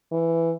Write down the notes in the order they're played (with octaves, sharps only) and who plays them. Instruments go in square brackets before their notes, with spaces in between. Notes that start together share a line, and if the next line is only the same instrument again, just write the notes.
[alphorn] E3